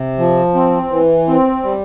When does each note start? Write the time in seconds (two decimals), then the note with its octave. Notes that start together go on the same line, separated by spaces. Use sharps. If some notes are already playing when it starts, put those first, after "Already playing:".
Already playing: C3
0.18 F3
0.54 C4
0.91 E3
1.27 C4
1.63 G3